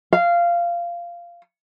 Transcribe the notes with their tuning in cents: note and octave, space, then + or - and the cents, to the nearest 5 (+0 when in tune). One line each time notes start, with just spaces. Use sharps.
F5 -15